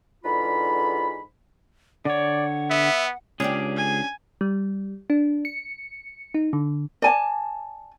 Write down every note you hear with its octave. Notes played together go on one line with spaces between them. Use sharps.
E2 G#2 D3 F4 B5
D3 C#5 D5 F#5
B3 E5
C#2 C#4 D4 G4 G#4
G#5
G3
D4
C#7
D#4
D3
D5 G#5 A5